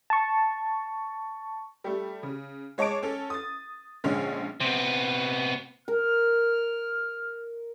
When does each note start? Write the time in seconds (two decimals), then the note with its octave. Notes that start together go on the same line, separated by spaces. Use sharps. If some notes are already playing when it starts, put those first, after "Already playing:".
0.10 A5 C#6
1.84 G3 A3
2.23 C#3
2.78 G#3 C#5 D#5 A5 D6 D7
3.03 C#4 A4
3.30 D#6 A6
4.04 A#1 D3 G#3 C#4 F6
4.60 C3 B3
5.88 A#4 F6